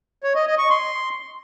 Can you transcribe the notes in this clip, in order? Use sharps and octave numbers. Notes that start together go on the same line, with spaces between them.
C#5
D#5
D#5
C#6
C6